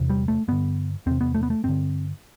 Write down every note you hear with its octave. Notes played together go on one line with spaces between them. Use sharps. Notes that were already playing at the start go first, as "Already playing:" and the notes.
Already playing: E2 C3
G3
A3
G2 D3 B3
E2 C3 C4
B3
A3
B3
A3
G2 D3 C4